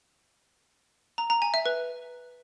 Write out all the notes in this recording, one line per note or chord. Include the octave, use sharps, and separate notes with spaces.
A#5
A#5
G#5
E5
B4